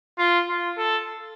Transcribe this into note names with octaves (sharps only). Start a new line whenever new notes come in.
F4
F4
A4